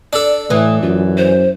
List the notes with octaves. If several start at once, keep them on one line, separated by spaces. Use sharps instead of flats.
D4 A4 D5
A2 E3 D#6
F#2 F4
C5